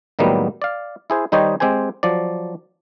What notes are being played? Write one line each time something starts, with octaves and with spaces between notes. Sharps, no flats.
A2 D#3 F#3 G3 A#3 B3
D5 F5
E4 G#4 C5
D#3 G3 D#4 C5 C#5 D#5
G#3 C4 G4 C5 G#5
F3 F#3 D5